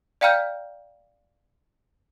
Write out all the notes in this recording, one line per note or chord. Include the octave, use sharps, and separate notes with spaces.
D5 F5 G5 A#5 F6 G6